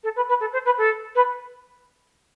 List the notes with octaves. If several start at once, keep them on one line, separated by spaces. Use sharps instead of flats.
A4
B4
B4
A4
C5
B4
A4
B4